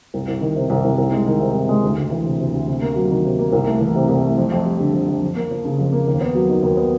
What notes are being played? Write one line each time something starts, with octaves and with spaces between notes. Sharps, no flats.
C2
C2
D#3
C3
C2
C2
C2
G#3
D#3
C3
C2
G#3
D2
D2
E3
C3
D2
D2
C3
A#3
F#3
D#3
C3
A#3
C2
A3
E3
C3
C2
A3
F2
F2
G3
D3
F2
F2
F2
A#3
F3
C#3
F2
A#3
D#2
B3
F#3
D#3
D#2
B3